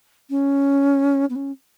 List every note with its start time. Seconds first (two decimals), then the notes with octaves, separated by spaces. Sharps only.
0.30 C#4
1.30 B3
1.35 C#4